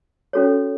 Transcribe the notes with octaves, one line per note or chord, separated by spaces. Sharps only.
C#4 F#4 A4 C#5